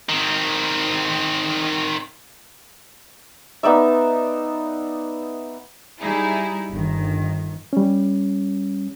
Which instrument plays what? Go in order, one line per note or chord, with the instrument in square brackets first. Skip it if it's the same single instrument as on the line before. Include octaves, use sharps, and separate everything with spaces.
[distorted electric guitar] D#3 C4
[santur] B3 D#4 D5 E5
[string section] G3 D#4 E4 G#4
G1 D#3
[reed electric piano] G3 C#4